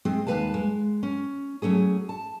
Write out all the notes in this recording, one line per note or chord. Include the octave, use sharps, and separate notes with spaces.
G#3 C4 G#4
D#2 G#3 A#3 B4 F5 A5
G#3
C#4
F#3 A3 C#4 G#4
A5